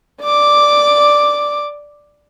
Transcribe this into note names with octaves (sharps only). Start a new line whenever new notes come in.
D5 D6